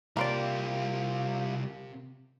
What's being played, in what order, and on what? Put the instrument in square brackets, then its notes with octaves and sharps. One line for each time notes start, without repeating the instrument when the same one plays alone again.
[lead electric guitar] C2 G4 [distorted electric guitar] C3 [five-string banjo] A#3 C5 D5 [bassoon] F4